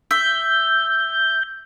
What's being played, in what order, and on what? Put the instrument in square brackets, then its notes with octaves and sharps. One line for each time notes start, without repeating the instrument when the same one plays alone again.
[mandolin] E5 [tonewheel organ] G6